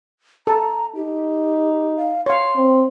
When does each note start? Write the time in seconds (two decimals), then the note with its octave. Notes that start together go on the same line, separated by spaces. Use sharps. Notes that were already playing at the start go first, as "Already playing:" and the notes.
0.47 A4 A#5
0.96 D#4 G4
1.97 F5
2.26 C#5 F5 C6
2.56 C4